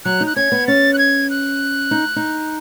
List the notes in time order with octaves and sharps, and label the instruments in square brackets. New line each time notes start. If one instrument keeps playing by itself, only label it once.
[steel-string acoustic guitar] F#3 [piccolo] F#6
[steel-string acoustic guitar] D#4
[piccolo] F#6
[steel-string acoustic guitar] C#4 [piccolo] G#6
[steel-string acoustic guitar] B3
[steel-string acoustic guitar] C#4 [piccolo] A6
[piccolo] F#6
G#6
F#6
[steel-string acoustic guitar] D#4
D#4